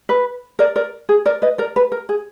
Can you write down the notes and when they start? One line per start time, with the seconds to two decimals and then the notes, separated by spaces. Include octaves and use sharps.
0.09 B4
0.59 A#4 D5
0.76 A#4 D5
1.09 G#4
1.26 A#4 D5
1.42 B4 D#5
1.58 A#4 D5
1.76 B4
1.92 A#4
2.09 G#4